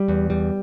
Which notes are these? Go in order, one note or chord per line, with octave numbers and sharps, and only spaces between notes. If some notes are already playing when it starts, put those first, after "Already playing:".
Already playing: G3
E2
G3